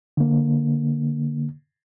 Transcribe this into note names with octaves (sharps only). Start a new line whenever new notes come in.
D3 A#3